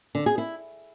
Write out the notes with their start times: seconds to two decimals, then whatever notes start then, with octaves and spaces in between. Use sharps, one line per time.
0.15 D3
0.26 G#4
0.38 E4